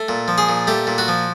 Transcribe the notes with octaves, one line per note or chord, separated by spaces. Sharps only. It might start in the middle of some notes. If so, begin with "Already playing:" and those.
Already playing: A3
A#2
F3
G#4
A#2
A3 G4
A#2
F#4
F3